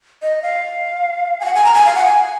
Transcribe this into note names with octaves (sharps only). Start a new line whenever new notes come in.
D#5
F5
G#5
F#5
G#5
A#5
G#5
F5
F#5
G#5